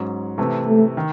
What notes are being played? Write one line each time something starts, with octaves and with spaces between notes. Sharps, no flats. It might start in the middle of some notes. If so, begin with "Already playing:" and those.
Already playing: G#2 F#3 C#4
C3 E3 A3
A3
D#3